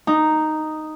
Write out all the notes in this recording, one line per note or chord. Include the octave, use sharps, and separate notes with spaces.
D#4